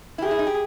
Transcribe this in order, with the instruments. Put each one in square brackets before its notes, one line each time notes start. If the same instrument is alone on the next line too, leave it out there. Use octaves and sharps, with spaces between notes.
[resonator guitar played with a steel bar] E4
[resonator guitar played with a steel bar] G4 [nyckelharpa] G#4
[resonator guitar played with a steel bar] E4
D#4
G4